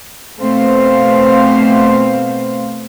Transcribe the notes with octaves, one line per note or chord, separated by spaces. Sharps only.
B2 A3 C4 C5 F5